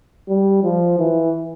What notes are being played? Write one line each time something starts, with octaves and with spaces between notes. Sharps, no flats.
G3
F3
E3